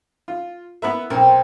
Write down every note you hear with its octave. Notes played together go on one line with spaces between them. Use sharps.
F4
B3 E4 A#4 B4 E5
B1 C4 A#4